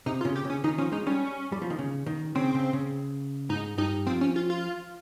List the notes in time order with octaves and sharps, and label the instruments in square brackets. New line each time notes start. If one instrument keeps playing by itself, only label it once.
[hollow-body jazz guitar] C3 [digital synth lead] D#4
[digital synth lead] F4
[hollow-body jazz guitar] C#3
[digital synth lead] G4
[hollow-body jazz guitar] C#3 [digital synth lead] C#4
[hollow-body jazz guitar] D#3 [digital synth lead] D#4
[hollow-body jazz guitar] F3 [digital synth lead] C#4
[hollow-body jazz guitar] G#3 [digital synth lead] D#4
[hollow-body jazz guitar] G3 [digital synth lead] C#4
[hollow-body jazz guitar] G3
F3
D#3
C#3
D#3
[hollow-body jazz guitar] C#3 [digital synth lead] C4
[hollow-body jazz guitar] C#3
C#3
[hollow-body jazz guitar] G#2 [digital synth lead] D#4
[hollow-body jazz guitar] G2 [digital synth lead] D#4
[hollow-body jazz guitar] F3 [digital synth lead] C4
[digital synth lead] C#4
F4
F4